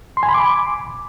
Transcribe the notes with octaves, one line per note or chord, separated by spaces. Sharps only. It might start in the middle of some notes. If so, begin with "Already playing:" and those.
C6
G#5
B5
D6